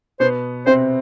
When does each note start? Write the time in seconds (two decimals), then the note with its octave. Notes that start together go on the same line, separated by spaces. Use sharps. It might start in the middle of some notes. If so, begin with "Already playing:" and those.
0.20 B2 B3 C5
0.66 C3 C4 C5